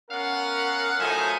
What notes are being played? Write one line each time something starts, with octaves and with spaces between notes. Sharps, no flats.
B3 C#4 A#4 F5 F#5
A2 F3 F#3 A3 D#4 G#5